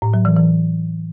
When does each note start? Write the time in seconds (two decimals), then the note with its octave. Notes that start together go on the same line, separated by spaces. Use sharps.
0.02 A2
0.14 F#3
0.25 E3
0.36 E3